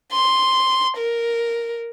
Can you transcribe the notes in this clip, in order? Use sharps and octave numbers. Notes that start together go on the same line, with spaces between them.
C6
A#4